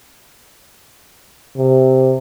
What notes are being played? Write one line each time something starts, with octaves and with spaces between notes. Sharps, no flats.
C3